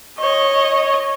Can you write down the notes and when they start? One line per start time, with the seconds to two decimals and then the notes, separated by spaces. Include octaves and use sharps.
0.18 C#5 D#5